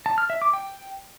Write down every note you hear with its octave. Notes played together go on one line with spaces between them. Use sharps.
A5
F6
E5
D6
G5